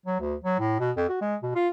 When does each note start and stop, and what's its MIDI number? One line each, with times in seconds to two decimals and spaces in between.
0.06 0.18 54
0.20 0.35 38
0.44 0.57 54
0.59 0.77 45
0.80 0.91 47
0.96 1.04 41
1.09 1.20 66
1.21 1.36 56
1.43 1.51 47
1.55 1.69 65